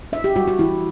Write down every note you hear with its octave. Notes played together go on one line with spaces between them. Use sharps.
D4 E5
G4
G3 F#4
F#4
E3 E4